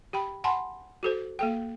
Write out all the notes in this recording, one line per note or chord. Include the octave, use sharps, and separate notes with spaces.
G4 G5 B5
F#5 G#5 A5 B5 C6
F#4 A4 C5
A#3 A4 G5